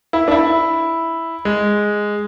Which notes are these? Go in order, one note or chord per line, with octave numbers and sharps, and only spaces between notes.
E4
D4
E4
G#3